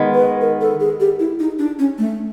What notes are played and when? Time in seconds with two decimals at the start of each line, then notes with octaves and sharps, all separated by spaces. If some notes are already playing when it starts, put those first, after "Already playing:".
Already playing: D#3 G#3 B3
0.14 B4
0.41 A#4
0.61 A4
0.80 G#4
1.00 G4
1.19 E4
1.40 D#4
1.59 D4
1.79 C#4
1.98 A3